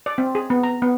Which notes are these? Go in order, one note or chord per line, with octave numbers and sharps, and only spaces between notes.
D5
C4
G#4
B3
A#5
B3